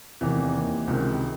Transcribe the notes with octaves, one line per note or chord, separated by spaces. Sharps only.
F1 E2 C3 D#3 E3
D#2 D#3
C#2 C3 D#3